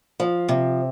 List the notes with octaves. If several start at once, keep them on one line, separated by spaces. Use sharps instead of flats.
F3
C3